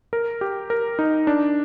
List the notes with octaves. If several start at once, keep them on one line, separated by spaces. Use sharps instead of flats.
A#4
G4
A#4
D#4
D4